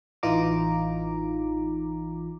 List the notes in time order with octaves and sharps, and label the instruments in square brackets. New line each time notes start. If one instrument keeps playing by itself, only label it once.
[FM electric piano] A1 E3 D#4 F4 A#5 D6